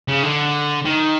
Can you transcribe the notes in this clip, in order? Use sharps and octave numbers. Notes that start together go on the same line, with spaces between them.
C#3
D3
D#3